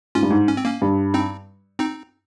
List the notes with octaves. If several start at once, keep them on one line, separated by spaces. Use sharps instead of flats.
G#2 C#4 F4
G2
G#2
C#4
C4
A#3 C#4
G2
C4 D#4
C4 D#4